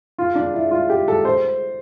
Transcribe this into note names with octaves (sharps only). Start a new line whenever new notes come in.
F4
D4
E4
F4
G4
A4
C5